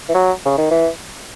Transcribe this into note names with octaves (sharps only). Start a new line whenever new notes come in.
E3
F#3
C#3
D#3
E3